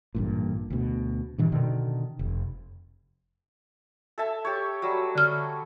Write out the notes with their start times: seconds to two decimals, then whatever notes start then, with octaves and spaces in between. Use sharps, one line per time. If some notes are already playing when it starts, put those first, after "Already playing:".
0.15 A1 G2 A#2
0.70 D2 B2
1.38 G2 A#2 D#3 E3
1.52 B2 D3 D#3
2.19 F1
4.18 A4 E5 A5
4.45 G4 C#5
4.82 F#3 G3
5.15 D3 F6